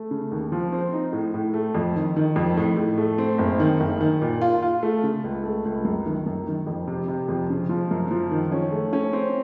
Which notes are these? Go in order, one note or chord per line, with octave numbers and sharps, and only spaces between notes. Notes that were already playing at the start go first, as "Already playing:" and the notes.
Already playing: A3
C#3
D#2
F3
C4
D#4
A2
A2
A3
F2
D#3
D#3
F2
A2
A2
A3
C4
F#1
D#3
F#1
D#3
A#2
F4
F4
A3
C#3
C#2
A3
C#2
F#2
D#3
F#2
D#3
F2
C3
C3
F2
C#3
F3
F#2
F3
D#3
C#4
A3
C#4
C4